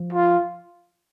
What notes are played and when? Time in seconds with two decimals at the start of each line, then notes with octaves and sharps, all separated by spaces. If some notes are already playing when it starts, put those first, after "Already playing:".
Already playing: F3
0.12 F4